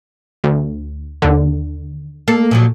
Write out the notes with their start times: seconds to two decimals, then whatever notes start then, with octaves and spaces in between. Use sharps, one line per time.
0.44 D2
1.22 D#2 D3
2.28 A#3 A4
2.51 A#2 F3 F#3